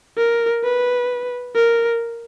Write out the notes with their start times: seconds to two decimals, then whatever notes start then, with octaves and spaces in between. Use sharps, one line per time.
0.17 A#4
0.64 B4
1.55 A#4